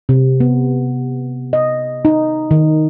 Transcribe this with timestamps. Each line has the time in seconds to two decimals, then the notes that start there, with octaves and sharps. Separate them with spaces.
0.09 C3
0.40 B3
1.53 D#5
2.05 D#4
2.51 D#3